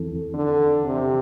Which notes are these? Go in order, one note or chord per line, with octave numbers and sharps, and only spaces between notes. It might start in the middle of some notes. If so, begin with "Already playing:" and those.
Already playing: E2 E3 C4 E4 A4
D3
C3